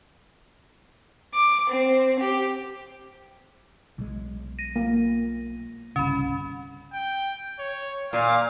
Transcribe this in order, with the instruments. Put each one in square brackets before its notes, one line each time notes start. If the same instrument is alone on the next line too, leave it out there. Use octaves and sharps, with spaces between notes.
[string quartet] D6
C4
G4
[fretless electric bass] B1 G#3
[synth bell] A#6 D#7
[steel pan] A#3
[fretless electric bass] G1 C2 C#3 [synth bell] C#4 B5
[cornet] G5
C#5
[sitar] A#2 [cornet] F5